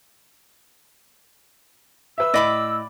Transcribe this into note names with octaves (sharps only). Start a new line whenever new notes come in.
B4 E5 E6
A2 D5 D#5 B5 D6